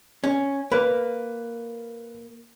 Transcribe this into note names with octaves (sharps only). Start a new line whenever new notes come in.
C#4
A#3 B4